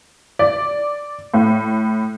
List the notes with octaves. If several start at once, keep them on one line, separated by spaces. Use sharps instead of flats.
D5
A2